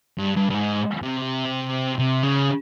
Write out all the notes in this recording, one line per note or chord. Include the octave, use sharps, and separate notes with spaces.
G2
G2
G2
G#2
C3
C3
C#3